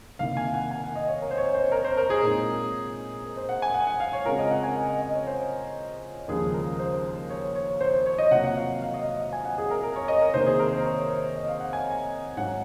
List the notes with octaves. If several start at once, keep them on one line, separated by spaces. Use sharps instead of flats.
C2 C3 D#3 A#3 F5
G#5
F#5
G#5
F#5
D#5
C#5
A#4
C5
C#5
C5
A#4
C5
A#4
G#4
A#2 G#3 C4 D#4
A#4
C5
F#5
G#5
F#5
F#5
F5
C#5
C#3 G#3 C4 F4 A#4
D#5
F#5
G#5
F#5
D#5
D#5
C#5
C5
D#2 C#3 F3 G#3 G#4
A#4
C5
C#5
C#5
C5
C5
C#5
D#5
C3 F#3 A#3 F4 F#5
F#5
F5
F5
D#5
D#5
F5
G#5
F#5
G#4
A#4
A#4
C#5
D#5
A#4
C3 D#3 A#3 C5
G#4
A#4
C5
C#5
C5
D#5
F5
F#5
G#5
G#2 F#3 C#4 F#5